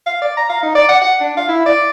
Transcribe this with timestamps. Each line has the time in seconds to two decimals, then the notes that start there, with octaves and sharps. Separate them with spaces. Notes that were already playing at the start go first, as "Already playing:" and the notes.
0.06 F5
0.22 D5
0.37 A#5
0.49 F5
0.63 D#4
0.75 D5
0.89 F#5
1.01 F#5
1.21 D4
1.37 F5
1.49 E4
1.66 D5